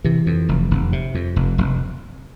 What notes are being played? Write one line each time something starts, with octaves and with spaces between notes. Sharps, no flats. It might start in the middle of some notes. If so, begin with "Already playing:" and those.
C3 E3
F2
F1
F1
C3
F2
F1
F1